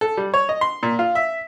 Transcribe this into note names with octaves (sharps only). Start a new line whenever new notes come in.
A4
G3
C#5
D#5
C6
A#2
F4
E5